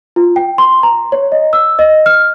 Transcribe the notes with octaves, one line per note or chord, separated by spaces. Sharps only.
F4
G5
C6
A#5
C#5
D#5
E6
D#5
F6